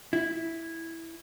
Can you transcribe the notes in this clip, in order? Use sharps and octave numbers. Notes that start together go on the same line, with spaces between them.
E4